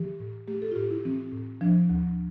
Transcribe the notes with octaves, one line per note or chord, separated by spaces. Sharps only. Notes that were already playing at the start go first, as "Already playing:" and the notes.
Already playing: E3 G4
A2
A3 G4
A4
F4
A2 G4
E4
E3 C4
A2
F3 D4
D2